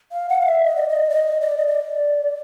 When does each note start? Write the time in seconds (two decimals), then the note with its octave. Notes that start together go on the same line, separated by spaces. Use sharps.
0.11 F5
0.29 F#5
0.41 F5
0.46 E5
0.64 D#5
0.76 D5
0.89 D#5
1.10 D5
1.15 D#5
1.41 D5
1.58 D#5
1.67 D5